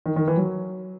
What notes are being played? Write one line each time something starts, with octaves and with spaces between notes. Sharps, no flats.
D#3
D#3
E3
F#3